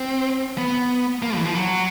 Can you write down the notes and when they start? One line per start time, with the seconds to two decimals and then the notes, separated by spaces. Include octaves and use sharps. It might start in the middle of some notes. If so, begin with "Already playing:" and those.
Already playing: C4
0.58 B3
1.23 A#3
1.36 E3
1.45 F3
1.55 F#3